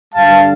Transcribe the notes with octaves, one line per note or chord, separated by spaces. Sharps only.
G2 D3 G3 F5 A5